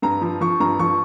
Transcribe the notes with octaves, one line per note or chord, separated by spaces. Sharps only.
G2 A#5
F3
F3 C#6
G2 A#5
F3 C#6